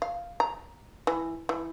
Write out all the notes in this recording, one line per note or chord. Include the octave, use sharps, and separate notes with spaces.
F5
A#5
E3
E3